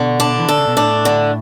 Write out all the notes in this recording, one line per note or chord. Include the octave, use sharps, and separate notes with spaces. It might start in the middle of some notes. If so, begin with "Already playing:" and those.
Already playing: B2 D3
D4
E3
D3 A4
C#3
B2
A2 D4
D3